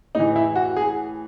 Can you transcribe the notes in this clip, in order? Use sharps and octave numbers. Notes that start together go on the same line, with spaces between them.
A2 E3 D#4
E4
F#4
G#4